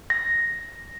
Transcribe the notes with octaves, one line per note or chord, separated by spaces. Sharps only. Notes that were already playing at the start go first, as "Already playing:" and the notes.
A#6